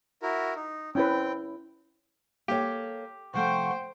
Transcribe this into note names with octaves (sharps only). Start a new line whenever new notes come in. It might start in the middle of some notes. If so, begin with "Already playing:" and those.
E4 F#4 A#4
D#4
C4 C#4 E4 B4 G5
A#3 G4 A4 C#5
C3 F3 A3 C5 F#5 G5 C#6